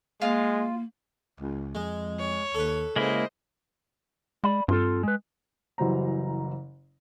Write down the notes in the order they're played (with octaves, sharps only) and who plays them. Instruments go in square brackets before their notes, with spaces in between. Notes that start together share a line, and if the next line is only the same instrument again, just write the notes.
[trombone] G#3 [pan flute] A#3 [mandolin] F4
[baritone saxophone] C#2
[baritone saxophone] F2 [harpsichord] G#3
[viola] C#5
[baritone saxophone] D#2 [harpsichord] A4 B4
[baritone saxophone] C#3 [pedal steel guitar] G#3 A#3 E4 [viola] C5 D#5
[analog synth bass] G#3 [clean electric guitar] D5 B5
[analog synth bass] G2 [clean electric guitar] C4 F4 A4
[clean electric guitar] G#3 B4
[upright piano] F#1 E3 F#3 G3 C5 A#5